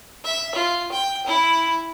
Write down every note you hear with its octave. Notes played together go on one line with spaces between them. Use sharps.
E5
F4
G5
E4